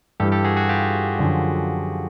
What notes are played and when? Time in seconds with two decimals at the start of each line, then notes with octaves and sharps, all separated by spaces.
0.20 G2 E3 G3 G4 A4
0.32 G4 A4
0.44 F#4 G#4
0.56 F#4 G#4
0.69 F4 G4
1.19 F#2 D3 F3